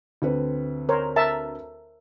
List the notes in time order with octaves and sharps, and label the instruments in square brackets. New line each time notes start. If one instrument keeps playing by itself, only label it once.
[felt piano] D2 C4 B4
[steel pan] A#4 C5 C#5
A#4 E5 A5